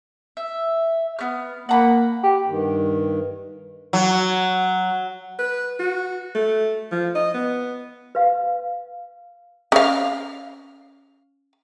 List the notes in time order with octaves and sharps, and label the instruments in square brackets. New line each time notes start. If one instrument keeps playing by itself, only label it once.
[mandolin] E5
B3 F6
[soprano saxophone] A#3 [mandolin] F#5 A#5 B5
[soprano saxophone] G4
[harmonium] G2 D#3
[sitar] F#3
[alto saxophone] B4
F#4
A3
F3
D#5
B3
[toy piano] B4 F5
[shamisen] C#4 F5